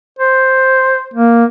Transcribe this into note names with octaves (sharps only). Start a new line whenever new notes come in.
C5
A#3